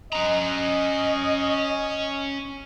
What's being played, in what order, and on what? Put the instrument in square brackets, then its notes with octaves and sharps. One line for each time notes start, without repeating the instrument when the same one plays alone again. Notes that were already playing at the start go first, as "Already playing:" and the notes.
[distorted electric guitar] C#4 A#5 [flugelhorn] D#5